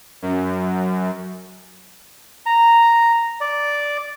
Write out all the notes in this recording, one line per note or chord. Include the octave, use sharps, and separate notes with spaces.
F#2
A#5
D5